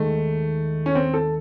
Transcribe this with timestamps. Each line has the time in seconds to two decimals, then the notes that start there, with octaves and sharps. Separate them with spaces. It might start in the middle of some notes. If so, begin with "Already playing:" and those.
Already playing: D#2 D#3 G#3 A3 D#4
0.86 C#4
0.95 C4
1.14 A4